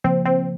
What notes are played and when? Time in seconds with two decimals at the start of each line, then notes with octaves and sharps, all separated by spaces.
0.04 C#3 F3 A#3 C4
0.25 C4